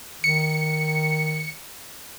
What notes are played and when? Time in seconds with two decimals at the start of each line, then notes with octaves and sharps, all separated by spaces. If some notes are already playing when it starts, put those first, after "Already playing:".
0.24 D#3 C#7